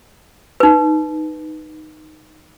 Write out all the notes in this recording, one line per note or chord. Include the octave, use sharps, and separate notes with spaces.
D#4 B4